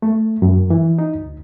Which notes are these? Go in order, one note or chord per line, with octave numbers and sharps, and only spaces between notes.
A3
F#2
E3
D#4
D2